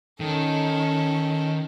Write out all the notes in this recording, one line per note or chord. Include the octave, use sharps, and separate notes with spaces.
D#3 C#4 A4